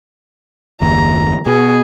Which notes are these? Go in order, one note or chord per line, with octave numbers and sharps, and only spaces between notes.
F#1 D#2 A#5
B2 G#4